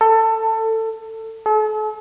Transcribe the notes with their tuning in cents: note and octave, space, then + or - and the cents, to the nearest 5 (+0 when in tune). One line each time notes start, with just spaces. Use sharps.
A4 +20
A4 -40